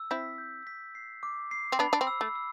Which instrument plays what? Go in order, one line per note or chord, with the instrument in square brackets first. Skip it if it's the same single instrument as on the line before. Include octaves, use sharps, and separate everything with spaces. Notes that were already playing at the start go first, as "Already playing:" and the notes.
Already playing: [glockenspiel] E6
[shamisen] C4 E4 [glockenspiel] B6
[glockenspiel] G6
B6
C7
D6
C7
[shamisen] C4
[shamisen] B3 D4 [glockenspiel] B5
[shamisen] D4
C4
[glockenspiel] E6
[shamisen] A3
[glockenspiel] E6